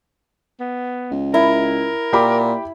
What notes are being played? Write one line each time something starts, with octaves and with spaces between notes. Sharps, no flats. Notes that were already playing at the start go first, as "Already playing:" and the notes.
B3
C#2
E4 A#4
A#2 G4 B5 D6